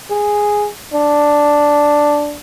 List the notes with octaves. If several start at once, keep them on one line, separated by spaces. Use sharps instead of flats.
G#4
D4